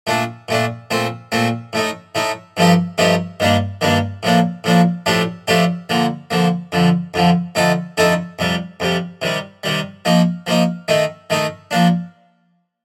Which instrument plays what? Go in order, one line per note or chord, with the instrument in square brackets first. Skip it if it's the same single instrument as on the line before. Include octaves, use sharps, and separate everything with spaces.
[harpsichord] A#2 A3 D4
A#2 A3 D4
A#2 A3 C4
A#2 A3 C4
A2 A3 D#4
A2 A3 D#4
G2 F3 A3 D#4 G4
G2 F3 A3 D#4 G4
G2 D#3 G3 A#3 D4
G2 D#3 G3 A#3 D4
A2 F3 A#3 D4
A2 F3 A#3 D4
A2 F3 A3 D4 G4
A2 F3 A3 D4 G4
D3 F3 A#3
D3 F3 A#3
F2 D3 F3
F2 D3 F3
F2 D3 A3 D#4 A4
F2 D3 A3 D#4 A4
F2 C3 G3
F2 C3 G3
C3 D#3 G3
C3 D#3 G3
F3 A#3 D#4
F3 A#3 D#4
D#3 A3 D#4
D#3 A3 D#4
F3 A#3 D4